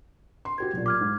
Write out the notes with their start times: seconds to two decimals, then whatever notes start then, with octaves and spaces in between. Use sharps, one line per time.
0.45 C6
0.58 F#4 G4 C5 G#6
0.73 B1 A#2
0.86 D6 F6 G#6
1.01 G#2